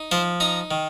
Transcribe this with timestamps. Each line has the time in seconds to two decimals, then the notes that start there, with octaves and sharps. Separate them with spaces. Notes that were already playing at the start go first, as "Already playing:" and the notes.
Already playing: D#4
0.11 F3 C5
0.40 D#4 A#5
0.71 D#3